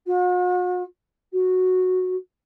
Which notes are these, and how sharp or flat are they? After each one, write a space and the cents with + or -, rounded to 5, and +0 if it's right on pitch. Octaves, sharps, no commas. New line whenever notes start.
F#4 -45
F#4 -5